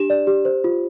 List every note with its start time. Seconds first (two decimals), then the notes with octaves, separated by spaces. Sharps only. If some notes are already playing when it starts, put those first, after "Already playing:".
Already playing: D4 G4 E7
0.10 D5
0.27 G4
0.45 C5
0.64 F4